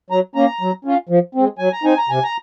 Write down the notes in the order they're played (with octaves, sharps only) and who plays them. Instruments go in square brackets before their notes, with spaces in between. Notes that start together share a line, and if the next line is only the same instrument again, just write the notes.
[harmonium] F#3 A#5
A#3 C#4 A#5
F#3
C#4 F4
F3
G#3 C4
F#3 G#5
A#5
C4 D#4 G#5
A#5
C3 G#5
A#5